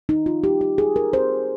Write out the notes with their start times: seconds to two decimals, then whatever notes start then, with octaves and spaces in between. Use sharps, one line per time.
0.09 D#4
0.26 F4
0.44 G4
0.61 G4
0.78 G#4
0.96 A#4
1.13 C5